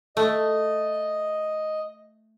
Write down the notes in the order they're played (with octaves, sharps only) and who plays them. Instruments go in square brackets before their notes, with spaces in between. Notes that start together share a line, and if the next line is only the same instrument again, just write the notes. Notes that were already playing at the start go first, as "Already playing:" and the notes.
[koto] A3 [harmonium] D#5